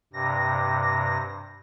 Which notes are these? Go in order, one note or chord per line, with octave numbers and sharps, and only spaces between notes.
G2 C3 A#6